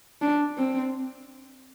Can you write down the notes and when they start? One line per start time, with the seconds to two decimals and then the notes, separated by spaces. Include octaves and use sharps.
0.22 D4
0.58 C4